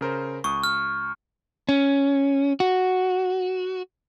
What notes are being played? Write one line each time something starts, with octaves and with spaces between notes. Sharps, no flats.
C#3 A#4 C5
C#2 C#6 D#6
F6
C#4
F#4